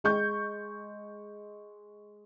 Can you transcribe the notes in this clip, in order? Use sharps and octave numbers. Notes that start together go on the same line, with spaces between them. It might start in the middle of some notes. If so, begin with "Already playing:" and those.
G#3 C#6 G6